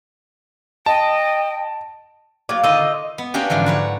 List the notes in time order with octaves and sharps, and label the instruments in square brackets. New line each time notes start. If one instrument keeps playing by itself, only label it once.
[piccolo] D#5 [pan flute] G5 [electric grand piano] A5
[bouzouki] F#3 F5 [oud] A#3 C#5 D5 [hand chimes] D6
[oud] D3 D#3 D4 [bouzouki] D#4 F4 D#5 [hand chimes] E6
[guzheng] B3
A#3 C#4 D4 G4
G#2 D3 E3 F3
F#4 B4 C#5